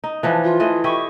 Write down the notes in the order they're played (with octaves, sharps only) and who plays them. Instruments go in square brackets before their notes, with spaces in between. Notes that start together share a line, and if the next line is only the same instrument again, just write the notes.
[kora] D#4
E3 F3 D4
[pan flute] F4
[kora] E3 A3 D#5
[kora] E4 G4 D#5 [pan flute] C#6